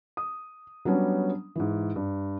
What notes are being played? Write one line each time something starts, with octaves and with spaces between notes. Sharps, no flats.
D#6
F#3 G3 B3 C#4 D4
G#2 E3
G2